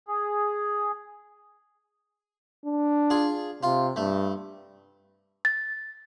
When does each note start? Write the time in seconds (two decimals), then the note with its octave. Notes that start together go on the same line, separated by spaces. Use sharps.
0.08 G#4
2.65 D4
3.10 F4 G#4
3.63 C3 F4
3.96 G2 A3
5.45 A6